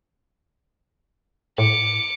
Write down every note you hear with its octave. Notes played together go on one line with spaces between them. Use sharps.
A2 D6 C#7